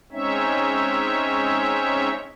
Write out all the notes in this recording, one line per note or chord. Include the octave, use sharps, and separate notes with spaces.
G#3 C4 C#4 D#4 C#5 E5